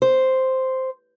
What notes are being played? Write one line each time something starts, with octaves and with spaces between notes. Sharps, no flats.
C5